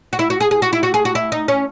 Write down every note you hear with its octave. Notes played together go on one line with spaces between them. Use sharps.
F#4
E4
F#4
G#4
G#4
F#4
E4
F#4
G#4
F#4
E4
D#4
C#4